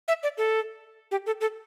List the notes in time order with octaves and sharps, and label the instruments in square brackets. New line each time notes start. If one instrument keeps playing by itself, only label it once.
[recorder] E5
D5
A4
G4
A4
A4